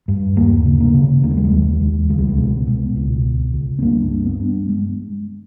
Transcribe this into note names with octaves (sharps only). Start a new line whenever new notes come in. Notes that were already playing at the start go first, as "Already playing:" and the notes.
G2
D#2 A#3
C#3
A#3
C#3
D#2 A#3
G#3
G3
G#3
D#2
D#2
C#2 G#3
G3
G#3
B2
B2
C#2
C#2
C#2
B3
G2 A#3
G2
B3
G2
G#3